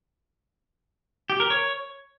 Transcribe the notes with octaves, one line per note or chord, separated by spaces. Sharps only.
G4
A#4
C#5